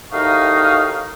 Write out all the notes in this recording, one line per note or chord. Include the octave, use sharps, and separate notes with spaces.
D#2 A2 D#4 F#4 D#5 F5